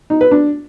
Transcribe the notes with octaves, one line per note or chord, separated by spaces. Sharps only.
D#4
B4
D4